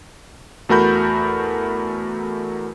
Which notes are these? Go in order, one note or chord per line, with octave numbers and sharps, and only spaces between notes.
E2 A3 F#4 A#4 B5 G6